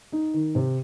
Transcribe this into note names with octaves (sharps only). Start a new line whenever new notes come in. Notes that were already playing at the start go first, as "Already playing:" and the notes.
D#4
D#3
C3